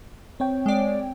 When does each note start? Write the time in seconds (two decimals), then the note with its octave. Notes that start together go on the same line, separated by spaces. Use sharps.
0.40 C4 C#5 G5
0.66 G#3 D5